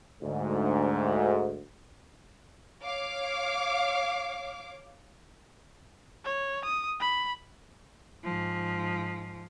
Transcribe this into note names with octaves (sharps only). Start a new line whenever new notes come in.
D2 G#2
C#5 F5 D6
C#5
D#6
B5
G#2 F3